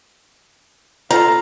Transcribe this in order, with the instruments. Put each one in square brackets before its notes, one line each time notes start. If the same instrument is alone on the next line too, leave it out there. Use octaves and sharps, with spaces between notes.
[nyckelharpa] F4 A4 [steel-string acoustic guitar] A#5